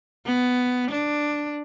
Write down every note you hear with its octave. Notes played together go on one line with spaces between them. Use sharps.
B3
D4